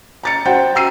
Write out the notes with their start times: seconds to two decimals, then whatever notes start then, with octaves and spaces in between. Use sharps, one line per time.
0.23 A#5 A6 C#7
0.45 F#4 C5 F#5 G5
0.75 A#5 E6 C7 D#7